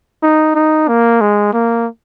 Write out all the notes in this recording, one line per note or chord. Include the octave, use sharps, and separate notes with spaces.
D#4
D#4
A#3
G#3
A#3